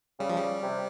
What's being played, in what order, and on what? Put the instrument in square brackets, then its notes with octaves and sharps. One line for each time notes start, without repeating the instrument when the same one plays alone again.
[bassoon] C#3 [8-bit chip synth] G3
[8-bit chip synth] F3
G3
[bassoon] C3